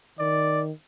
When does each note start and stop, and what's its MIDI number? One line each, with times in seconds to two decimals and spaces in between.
0.19 0.71 51
0.19 0.62 74